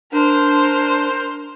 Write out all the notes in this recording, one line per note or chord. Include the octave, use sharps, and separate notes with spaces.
D4 A#4 C5